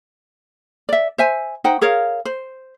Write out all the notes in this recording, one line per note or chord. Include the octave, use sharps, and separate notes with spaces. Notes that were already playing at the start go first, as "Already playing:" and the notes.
D5 E5
C5 E5 G#5
D#4 C5 F#5 G5
G#4 A#4 C#5 F5
C5